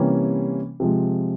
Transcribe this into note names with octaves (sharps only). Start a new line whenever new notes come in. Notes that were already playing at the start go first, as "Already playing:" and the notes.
Already playing: C3 E3 G3 A#3 C#4
C3 F3 G#3